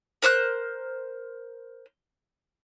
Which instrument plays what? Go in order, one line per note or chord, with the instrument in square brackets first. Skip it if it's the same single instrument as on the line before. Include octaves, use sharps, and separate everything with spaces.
[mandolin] A#4 C5 D#6 F#6